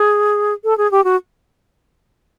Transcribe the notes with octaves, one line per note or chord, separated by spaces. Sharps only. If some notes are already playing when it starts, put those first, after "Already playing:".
Already playing: G#4
A4
G#4
G4
F#4